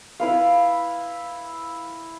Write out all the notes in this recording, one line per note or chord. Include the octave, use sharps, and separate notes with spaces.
E4 B4 F5